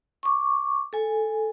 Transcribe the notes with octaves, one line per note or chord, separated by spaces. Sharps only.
C#6 D6
A4 G#5